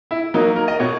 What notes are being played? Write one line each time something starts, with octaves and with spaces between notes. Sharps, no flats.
E4
F#3 A#3 D#4
A#4
D#5
B2 C#5